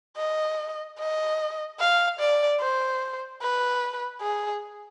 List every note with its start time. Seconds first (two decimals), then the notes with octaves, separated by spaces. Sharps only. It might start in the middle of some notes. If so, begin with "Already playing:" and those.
0.17 D#5
0.99 D#5
1.80 F5
2.19 D5
2.60 C5
3.41 B4
4.21 G#4